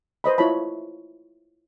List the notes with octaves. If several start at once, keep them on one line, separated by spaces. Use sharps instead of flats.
B4 C5 D#5 B5
E4 F4 C#5 A5 B5